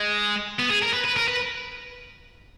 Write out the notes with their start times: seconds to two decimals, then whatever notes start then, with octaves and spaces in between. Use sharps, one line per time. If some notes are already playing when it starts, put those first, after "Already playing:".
Already playing: G#3
0.59 B3
0.70 G#4
0.82 A#4
0.93 B4
1.04 B4
1.16 A#4
1.28 B4